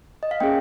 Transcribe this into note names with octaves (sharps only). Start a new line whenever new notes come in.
D#5
F5
A#3 C#4 G#4 G5